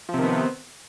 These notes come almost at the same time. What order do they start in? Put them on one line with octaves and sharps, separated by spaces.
F3 C3 D#3 B3 C4